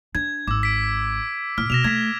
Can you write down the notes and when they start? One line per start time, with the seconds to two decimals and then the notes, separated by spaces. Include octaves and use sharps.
0.15 D4 G#6
0.47 G#1 D6 E6
0.63 B6 D7
1.58 A2 F6
1.70 B2 A#6 E7 F7
1.84 A3 G#6 B6